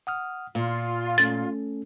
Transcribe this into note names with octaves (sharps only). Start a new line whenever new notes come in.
F#5 D#6 F6
A#2 F4 F5
A3 C#4 A4 A6